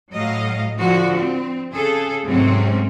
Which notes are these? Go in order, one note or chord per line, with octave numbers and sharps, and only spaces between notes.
A2 F#3 D#5 F5
D3 F3 F#4
C4
C#3 G#4 A4
G#2 C3 F#3 A3 C4 C#4